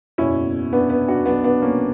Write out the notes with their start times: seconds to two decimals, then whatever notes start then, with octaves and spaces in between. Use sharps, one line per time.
0.18 F#1 E2 B2 C#4 E4
0.73 B3 D4
0.90 B3
1.08 D4 F#4
1.26 B1 B2 B3 D4
1.44 B3 D4
1.62 A#3 C#4